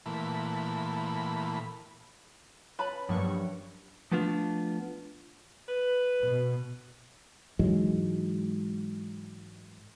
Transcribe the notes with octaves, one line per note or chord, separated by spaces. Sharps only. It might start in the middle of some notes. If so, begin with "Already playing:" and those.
A#2 E3 A3 B5
C#4 B4 A5 B5
G2 F3 F#3 A#3 C#6
F3 A3 B3 D4 F4
B4
B2
G#2 E3 F#3 G#3